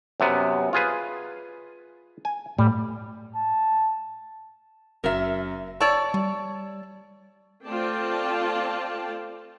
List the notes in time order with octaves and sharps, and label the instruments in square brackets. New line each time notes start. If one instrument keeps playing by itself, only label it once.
[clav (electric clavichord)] F#2 C3 B3
F4 G#4 B4
G#5
[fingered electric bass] A2 [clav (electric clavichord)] G3
[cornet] A5
[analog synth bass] F#1 [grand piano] F#2 [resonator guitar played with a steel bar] A#4 E5
[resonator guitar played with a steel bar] C#5 D5 A5 [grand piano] C#6 E6
[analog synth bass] G3
[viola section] A3 C4 F4 D5 G5 A5